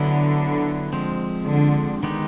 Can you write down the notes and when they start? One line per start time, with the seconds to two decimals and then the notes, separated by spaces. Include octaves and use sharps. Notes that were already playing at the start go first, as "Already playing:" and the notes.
Already playing: D3 F#3 B3 E4
0.93 F3 G#3 C4
1.48 D3
2.03 D#3 G#3 B3 D#4 G4